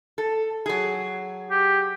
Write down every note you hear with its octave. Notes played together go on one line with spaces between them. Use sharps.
A4
F#3 G#4
G4